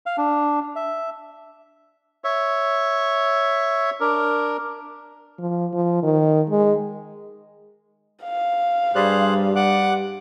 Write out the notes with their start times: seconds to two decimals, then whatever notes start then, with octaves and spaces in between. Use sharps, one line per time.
0.06 F5
0.17 D4
0.76 E5
2.24 C#5 E5
4.00 D4 A#4
5.39 F3
5.73 F3
6.03 D#3
6.50 G#3
8.23 F5
8.95 G2 G3 G#4 C5 F#6
9.56 G3 F#5 D6 F#6